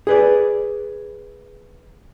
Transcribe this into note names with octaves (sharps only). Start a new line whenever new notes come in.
G#4 B4 D5